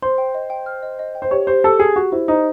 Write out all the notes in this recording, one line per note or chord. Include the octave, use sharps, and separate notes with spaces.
C5 C6
G5
D#5
G5
F6
D#5
D#5
G5
C5
G4 C#5
G4 C5
G4 A4
G4 G#4
F#4 G4
E4 C5
D#4 C5